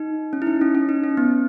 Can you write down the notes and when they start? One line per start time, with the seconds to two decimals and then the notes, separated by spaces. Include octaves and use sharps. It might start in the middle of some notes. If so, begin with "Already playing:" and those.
Already playing: D#4
0.33 C#4
0.42 E4
0.47 D#4
0.61 C#4
0.75 C#4
0.89 D#4
1.04 C#4
1.17 B3